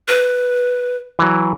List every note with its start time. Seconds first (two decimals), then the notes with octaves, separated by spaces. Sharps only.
0.08 B4
1.19 E3 F#3